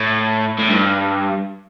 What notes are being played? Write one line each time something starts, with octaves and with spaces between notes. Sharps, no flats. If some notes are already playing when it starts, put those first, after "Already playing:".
Already playing: A2
A2
G2